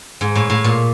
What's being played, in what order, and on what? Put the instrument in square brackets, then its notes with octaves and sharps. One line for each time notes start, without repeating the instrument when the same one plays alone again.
[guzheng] G#2
A2
A2
A#2